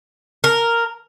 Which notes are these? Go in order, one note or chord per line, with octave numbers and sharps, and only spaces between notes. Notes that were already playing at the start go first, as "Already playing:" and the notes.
A#4